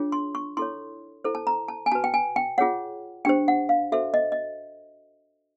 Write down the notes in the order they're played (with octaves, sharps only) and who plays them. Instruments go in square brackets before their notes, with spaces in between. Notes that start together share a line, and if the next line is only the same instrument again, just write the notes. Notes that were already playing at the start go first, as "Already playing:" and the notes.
Already playing: [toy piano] D4 F4 G#4 C#5
C6
C#6
E4 A4 C#5 C6
E4 A4 C5
A5
A#5
A5
G#5
F#4 B4 A5
G5
G#5
G5
F4 G#4 C#5 F#5
D4 G4 C5 G5
F#5
F5
F#4 A4 C5 E5
D#5
D#5